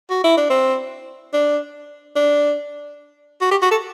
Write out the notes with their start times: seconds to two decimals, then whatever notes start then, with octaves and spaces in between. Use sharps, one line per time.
0.10 F#4
0.24 E4
0.37 D4
0.50 C4
1.33 D4
2.16 D4
3.41 F#4
3.51 G4
3.62 F#4
3.71 A4